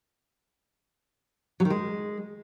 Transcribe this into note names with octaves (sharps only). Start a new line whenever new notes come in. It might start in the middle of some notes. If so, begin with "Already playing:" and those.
F#3
D#3
G#3